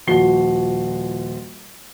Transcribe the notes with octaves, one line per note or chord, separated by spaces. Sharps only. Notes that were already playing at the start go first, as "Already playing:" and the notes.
D#1 F3 F#4 C7 G7